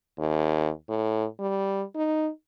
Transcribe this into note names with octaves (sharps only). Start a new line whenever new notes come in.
D#2
A2
G3
D#4